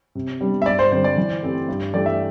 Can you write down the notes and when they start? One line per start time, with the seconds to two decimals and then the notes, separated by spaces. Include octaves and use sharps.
0.15 C3
0.41 G3 B3 D4
0.62 E5
0.66 G2 D5
0.79 C5
0.91 D3 G3 C4 C5
1.04 D5
1.17 E3
1.43 A3 C4 G4 B4
1.68 G2
1.94 E3 A3 D4 G4 D5
2.06 E5